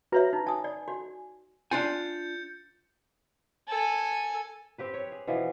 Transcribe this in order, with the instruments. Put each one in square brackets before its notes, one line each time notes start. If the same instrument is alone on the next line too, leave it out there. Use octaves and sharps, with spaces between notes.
[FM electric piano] F#4 A#5 [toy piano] B4 C#5 E5
[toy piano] D#4
[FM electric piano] G#5 [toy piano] A5 D#6
[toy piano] D5
F#4
[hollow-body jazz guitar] D4 F4 G#5 [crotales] G6 A6 C#7
[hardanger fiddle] A4 G#5
[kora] C4 G4 B4
C#5
G#4
B2 E3 F3